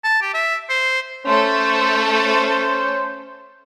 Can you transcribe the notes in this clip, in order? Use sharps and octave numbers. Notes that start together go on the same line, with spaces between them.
A5
G4
E5
C5
A3 C#4 A4 C5